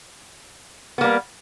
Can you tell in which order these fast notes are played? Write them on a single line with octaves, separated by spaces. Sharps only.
B3 A#3 G3